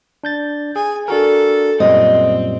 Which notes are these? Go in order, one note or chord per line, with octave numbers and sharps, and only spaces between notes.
D4 G6 A6
G#4 G#5
D4 F#4 A4 A#4
F#2 A#2 G3 C4 D#5